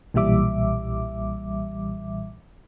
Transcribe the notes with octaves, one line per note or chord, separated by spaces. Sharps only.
B1 A#2 E3 G3 E5 D6